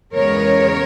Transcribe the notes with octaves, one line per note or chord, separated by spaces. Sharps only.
E2 C#3 G#3 B3 A#4 C#5